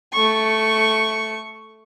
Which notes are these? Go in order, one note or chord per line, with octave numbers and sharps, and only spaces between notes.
A3 C#6